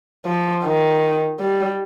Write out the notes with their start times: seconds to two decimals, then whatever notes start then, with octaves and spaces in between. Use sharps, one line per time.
0.26 F3
0.64 D#3
1.39 G3